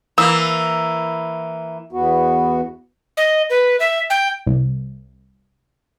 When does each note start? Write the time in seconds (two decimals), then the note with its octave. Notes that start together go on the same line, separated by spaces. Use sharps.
0.18 E3 A#3 E6
1.92 E2 B3 F#4
3.17 D#5
3.50 B4
3.80 E5
4.10 G5
4.47 C2